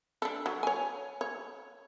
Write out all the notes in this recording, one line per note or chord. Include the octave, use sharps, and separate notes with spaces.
D4 A4
F#3
C#5 G#5
C#5